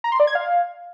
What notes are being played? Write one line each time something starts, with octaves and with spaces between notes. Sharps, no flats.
A#5
C6
D5
G#6
F5